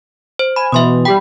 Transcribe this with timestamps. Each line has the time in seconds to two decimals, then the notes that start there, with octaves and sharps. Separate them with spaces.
0.39 C5
0.56 G#5 B5
0.72 B2 E3 E5 C6 D#6
1.05 G3 G4 G5 B5